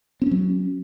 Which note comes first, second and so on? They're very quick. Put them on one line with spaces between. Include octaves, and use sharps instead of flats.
C4 C#4 F#3